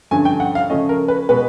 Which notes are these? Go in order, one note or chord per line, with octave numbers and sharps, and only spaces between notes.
G2 D3 F3 A3 C#4 G#5
G5
F#5
F5
C#3 F3 A3 C#4 D#5
A#4
B4
B2 G#3 B3 B4